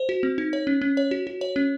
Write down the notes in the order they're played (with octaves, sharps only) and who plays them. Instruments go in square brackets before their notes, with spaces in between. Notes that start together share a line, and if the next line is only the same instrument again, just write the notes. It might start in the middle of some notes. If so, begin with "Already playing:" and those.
Already playing: [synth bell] C5
F#4
C4
D#4
C#5
C#4
C#4
C#5
F#4
F#4
C#5
C#4